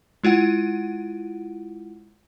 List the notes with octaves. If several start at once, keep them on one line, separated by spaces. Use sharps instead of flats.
G#3 E4 F4 F#5